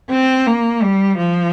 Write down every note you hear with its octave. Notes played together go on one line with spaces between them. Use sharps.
C4
A#3
G3
F3